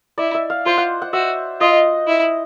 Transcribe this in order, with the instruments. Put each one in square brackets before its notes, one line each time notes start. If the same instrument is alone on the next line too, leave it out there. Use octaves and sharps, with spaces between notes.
[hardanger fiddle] E4 [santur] D5
[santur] E5
F5
[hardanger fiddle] F4 [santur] C5
[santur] F#5
F#5
[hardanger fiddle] F#4 [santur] E5
[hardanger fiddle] F4 [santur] D#5
[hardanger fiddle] E4